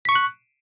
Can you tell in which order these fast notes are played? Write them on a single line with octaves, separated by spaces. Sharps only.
B6 C#6 C#7 F#6